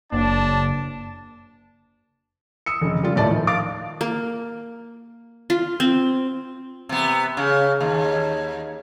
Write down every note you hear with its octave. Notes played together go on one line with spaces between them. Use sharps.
F#1 A#3 D4 A5
D#6 E6 C#7
F1 C#3
G3 F4
D#1 A2 D5 E5 A5
D#3 F3
F5 D6 A6
A#3
F4
C4
C3 B3
C#3
D#2